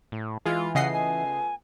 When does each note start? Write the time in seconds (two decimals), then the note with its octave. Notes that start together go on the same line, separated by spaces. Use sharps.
0.12 A2
0.45 E3 G#3 F4
0.75 C#3 A3 B3 F4 D#5 F#5 C7
0.93 G#5